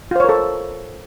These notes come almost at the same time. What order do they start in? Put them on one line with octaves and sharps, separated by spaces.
F4 C5 C#5 A#4 A4